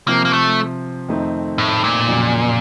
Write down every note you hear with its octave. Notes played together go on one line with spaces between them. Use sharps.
C3 F3 A#3 C4
A#3
A3
F2 D#3 A3 C4 D#4
A2
A#2
F2 C#3 F#3